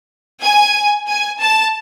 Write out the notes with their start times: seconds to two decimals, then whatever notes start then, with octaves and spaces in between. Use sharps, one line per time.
0.42 G#5
1.07 G#5
1.40 A5